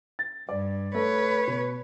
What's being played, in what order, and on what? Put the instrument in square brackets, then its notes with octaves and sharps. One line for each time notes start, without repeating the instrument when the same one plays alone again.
[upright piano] A6
[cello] G2 [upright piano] D5
[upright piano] A3 [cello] B4 C#5
[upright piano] B2